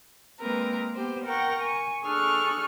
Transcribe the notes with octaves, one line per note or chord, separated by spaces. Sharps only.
G#3 A#3 C4 A#4 B4
B3 G4 C5
A#4 F#5 G5 A#5 C#6 A#6
G#5 C#6
D4 G#4 A4 C#6 F6 F#6